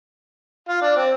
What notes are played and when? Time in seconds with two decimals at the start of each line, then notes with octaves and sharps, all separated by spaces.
0.69 F4
0.82 D4
0.96 C4